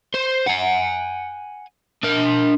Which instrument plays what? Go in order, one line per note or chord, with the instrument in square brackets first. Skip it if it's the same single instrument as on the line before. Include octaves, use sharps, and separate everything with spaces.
[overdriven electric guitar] C5
F#5 G#5
D4 A#4